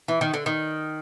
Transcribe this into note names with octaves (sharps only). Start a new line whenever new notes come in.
E3
D#3
D3
D#3